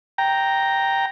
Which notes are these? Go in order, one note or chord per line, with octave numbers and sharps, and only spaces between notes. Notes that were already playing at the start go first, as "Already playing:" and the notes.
G5 A#5